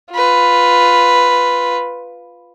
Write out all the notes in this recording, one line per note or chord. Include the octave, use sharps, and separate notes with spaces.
F4 B4